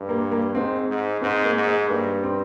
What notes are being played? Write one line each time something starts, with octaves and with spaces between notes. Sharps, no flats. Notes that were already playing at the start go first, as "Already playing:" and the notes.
Already playing: G2
A#3
A#3
G#2 C4
G#2
G#2 C4
A#3
G#2
G#3
G2 A#3
C4